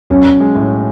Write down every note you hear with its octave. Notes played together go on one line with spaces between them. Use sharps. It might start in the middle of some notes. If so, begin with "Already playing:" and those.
B1 C#4
B1
G#3
A2